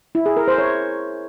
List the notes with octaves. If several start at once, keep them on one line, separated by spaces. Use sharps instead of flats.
E4
G#4
A#4
C5
C#5